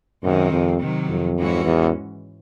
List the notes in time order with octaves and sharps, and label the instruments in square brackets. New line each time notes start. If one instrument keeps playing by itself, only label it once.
[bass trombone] F#2 [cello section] C3 D#3 G#3 C4
[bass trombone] F2
[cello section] C3 D#3 F#3
[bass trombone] F2
[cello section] G#2 E3 G#3 C#4 F#4
[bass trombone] E2